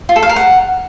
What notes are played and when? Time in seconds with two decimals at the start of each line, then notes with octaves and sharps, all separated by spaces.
0.09 F4
0.16 A4
0.23 F5
0.29 A#4
0.36 F#5